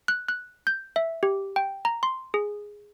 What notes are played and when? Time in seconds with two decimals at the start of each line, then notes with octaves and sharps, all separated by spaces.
0.08 F#6
0.28 F#6
0.67 G6
0.96 E5
1.23 G4
1.56 G5
1.85 A#5
2.03 C6
2.34 G#4